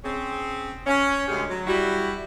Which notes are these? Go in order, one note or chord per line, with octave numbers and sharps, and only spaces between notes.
C4 C#4 G#4
C#4
D2 D3 G#3 C#4 G4 G#4
F#3
G3 E4 F#4